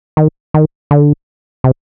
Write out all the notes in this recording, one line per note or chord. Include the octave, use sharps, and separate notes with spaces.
D#3
D#3
D3
C3